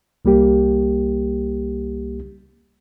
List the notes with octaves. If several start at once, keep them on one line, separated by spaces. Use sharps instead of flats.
C2 G3 A#3 G4